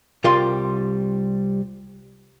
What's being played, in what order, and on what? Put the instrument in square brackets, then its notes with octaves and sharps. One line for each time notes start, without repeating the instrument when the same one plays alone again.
[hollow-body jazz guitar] C2 G3 F4 A#4 F5 C6